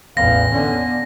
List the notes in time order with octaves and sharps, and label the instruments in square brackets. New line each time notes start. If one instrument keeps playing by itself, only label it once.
[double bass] A1 E2 [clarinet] F5 [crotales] A#6
[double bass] D3 C#4 [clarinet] B3